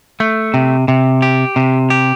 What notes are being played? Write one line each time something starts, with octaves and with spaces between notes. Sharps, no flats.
A3
C3
C3
G4
C3
G4